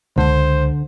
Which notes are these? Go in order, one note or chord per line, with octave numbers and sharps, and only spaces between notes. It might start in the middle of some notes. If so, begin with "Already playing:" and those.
C#2 D3 C5